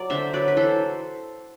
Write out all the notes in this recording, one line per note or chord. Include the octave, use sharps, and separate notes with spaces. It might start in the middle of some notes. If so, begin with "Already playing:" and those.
Already playing: F#3 D5
D3 C5 E5
F#3 B4 D5
B4
E3 A4 C5